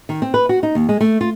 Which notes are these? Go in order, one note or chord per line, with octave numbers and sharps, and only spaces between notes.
D#3
C4
B4
F#4
D#4
D#2
G#3
A3
F4